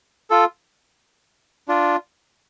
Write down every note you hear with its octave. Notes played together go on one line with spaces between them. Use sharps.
F4 A4
D4 F4